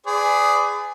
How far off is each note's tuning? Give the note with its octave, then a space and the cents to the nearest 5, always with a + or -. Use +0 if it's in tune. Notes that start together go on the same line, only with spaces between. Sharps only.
G#4 +0 B4 +35 D5 -5